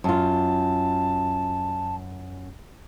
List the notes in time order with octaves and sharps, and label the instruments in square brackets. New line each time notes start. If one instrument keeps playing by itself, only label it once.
[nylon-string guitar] F#2 F4 [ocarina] A5